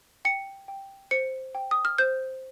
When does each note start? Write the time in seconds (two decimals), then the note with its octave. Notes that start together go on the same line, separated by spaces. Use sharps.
0.25 G5 C#7
0.68 G5
1.11 C5 C#7
1.55 G5
1.71 D#6
1.85 F6
1.98 C5 G6